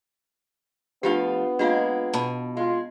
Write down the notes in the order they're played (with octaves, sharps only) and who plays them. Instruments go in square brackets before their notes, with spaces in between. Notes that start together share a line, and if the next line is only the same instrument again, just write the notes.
[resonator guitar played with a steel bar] F3 A3 F5 [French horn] B3 [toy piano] D4 F4 G4
[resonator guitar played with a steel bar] G#3 A#3 C4 [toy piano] D4 F4 F5
[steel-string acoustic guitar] B2 [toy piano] A5 B5
[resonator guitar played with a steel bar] G#3 [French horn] F4